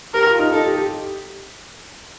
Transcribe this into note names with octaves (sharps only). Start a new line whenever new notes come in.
G4 A#4
F4
D#4
D#4 A4
G4
G4